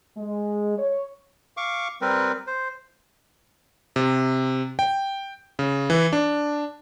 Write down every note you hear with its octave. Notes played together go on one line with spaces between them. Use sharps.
G#3
C#5
F5 C#6 D6
G3 C4 A#4 B4
C5
C3
G5
C#3
E3
D4